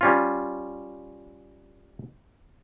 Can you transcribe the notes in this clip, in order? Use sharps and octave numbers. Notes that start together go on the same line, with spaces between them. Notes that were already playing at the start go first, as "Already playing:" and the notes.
G3 C#4 F4